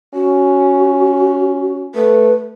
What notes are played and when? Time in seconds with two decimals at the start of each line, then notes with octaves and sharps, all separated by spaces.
0.14 C#4 F#4
1.95 A3 B4